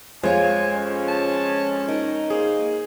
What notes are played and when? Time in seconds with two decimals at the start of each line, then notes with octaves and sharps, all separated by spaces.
0.23 F2 G#3 F4 C5 C#5 F5 G#5
0.75 C#4
1.08 A5
1.88 D#4 A#4
2.30 A#3 G#4 C5